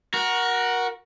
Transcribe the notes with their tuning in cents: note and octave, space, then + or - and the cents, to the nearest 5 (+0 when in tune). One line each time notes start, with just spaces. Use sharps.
F#4 +0 A#4 +20